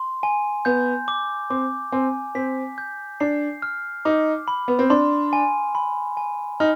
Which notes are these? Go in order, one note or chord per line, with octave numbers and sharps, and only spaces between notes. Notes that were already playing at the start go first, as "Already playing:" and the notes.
Already playing: C6
G#5
B3 G6
D6
C4 D6
C4 G#5
C4 B6
G6
D4 C7
F6
D#4 D6
B5
B3
C4
D4 C6
G#5
B5
G#5
D#4 F6